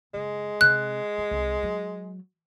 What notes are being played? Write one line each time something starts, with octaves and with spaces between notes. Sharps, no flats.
F#1 G#3
C3 C4 F#6
F4
C2
F#3